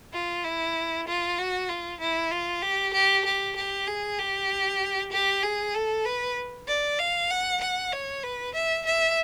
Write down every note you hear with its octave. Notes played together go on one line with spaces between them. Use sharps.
F4
E4
F4
F#4
F4
E4
F4
G4
G4
G4
G4
G#4
G4
G4
G#4
A4
B4
D5
F5
F#5
F#5
C#5
B4
E5
E5